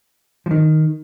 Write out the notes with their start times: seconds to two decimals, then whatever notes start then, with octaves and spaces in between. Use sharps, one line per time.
0.46 F3
0.51 D#3